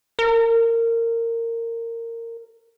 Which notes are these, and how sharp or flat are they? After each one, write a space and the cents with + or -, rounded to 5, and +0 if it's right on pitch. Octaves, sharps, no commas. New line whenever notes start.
A#4 -20